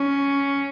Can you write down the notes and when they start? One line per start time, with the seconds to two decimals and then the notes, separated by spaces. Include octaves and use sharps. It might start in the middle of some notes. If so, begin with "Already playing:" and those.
Already playing: C#4